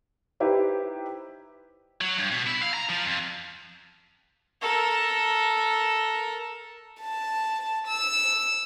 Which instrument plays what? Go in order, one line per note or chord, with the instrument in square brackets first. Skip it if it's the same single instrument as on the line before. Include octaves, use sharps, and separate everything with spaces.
[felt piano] D#4 E4 G4 B4 C5
[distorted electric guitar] F#3
G2
B2
E4
F5
A#5
F3
F2
[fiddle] A4 A#4
[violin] A5
E6